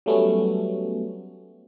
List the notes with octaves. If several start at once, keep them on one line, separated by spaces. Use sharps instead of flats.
F#3 G3 A3 B3 C#4